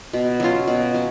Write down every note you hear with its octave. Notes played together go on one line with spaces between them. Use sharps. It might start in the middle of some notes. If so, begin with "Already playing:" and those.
B2
F#3 C#4 F4
B2
F#3 C#4